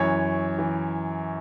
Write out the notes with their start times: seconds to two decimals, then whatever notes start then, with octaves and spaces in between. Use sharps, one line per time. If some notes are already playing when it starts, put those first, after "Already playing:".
Already playing: F#2 E3 C#5
0.58 E3